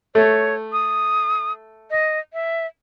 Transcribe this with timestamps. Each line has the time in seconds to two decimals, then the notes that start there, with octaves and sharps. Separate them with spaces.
0.15 A3 C#5
0.73 D#6
1.91 D#5
2.33 E5